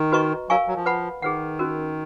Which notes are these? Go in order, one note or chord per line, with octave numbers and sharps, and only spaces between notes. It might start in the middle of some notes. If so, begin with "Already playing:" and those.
Already playing: D#3
F#4 B4 D#5 A#5 C#6
F#3 A#4 F5 G#5 C#6
F#3
F3
B4 F#5 B5
D#3 G#4 B4 F#5
C#4 F#4 A#4